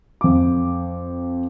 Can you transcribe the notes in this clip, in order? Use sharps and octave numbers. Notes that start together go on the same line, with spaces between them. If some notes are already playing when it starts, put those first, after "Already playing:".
F2 D6